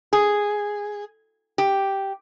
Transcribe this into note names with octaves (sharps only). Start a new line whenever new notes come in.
G#4
G4